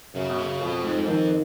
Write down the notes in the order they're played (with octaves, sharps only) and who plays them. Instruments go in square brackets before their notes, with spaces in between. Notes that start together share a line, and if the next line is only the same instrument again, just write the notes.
[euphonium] F#2 [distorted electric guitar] C#3
[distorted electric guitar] B2
C#3
[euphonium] F2 [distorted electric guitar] B2
[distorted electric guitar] G#2
[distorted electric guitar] F2 [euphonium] D#3